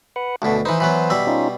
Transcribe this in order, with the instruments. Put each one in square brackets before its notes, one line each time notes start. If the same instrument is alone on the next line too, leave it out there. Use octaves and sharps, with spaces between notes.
[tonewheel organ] B4 F#5
[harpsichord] D2 B2 [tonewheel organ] A4
[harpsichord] E3 D#4 [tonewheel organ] B4 C5
[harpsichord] E3 F#3 B3
B2 G3 E5
[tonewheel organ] C#4 D#4 F4